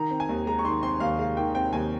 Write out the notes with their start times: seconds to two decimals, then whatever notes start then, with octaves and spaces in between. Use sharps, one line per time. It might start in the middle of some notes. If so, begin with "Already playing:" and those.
Already playing: D#3 A#5
0.11 C4
0.20 G#5
0.29 D#2
0.47 G#3 A#5
0.59 C#6
0.65 D#3 C6
0.83 C4 C6
1.00 D#2 F5
1.19 G#3 F5
1.37 D#3 G5
1.55 C4 G5
1.73 D#2 G#5